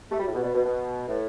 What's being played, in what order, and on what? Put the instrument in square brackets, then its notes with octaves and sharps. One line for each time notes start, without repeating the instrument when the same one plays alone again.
[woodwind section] A3 [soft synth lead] G4
[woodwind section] G3
[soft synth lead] F#4
[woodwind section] A2
[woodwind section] B2 [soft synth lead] G4
[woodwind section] B2 [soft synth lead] D5
[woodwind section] B2 [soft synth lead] B4
[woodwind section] B2 [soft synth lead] B4
[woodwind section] A2